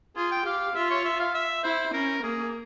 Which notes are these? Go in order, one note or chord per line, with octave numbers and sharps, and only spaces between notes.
F4 G#4
G5
G4 F5
F4 E5
C#5
E5
F5
E5
E4 C5
C#4 A#4
A#3 G#4